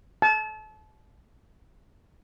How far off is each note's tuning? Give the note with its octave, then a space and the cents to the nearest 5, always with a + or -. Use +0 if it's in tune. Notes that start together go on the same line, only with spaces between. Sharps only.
A5 -30